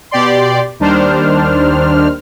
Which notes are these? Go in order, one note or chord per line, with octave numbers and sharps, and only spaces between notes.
B2 G4 D5 C6
D#2 D#3 G3 D4 C5 F6